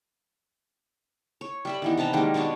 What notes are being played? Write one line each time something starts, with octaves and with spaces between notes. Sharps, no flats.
C#5
G3 E5 B5
D#3 E3 B3
C3 B4 A5 A#5
D#3 G3 G#3 A#3
B2 B3 D4 C#5